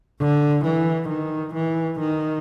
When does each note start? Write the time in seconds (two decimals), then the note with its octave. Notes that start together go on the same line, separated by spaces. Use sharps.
0.20 D3
0.65 E3
1.09 D#3
1.54 E3
2.00 D#3